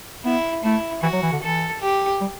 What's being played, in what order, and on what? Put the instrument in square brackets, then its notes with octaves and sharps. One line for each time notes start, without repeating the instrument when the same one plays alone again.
[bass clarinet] B3 [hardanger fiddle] E4
[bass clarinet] A3 [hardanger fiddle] E4
[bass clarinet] E3 [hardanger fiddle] F#4
[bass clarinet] F#3
E3
D3
[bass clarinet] E3 [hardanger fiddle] A4
[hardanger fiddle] G4
[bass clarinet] G3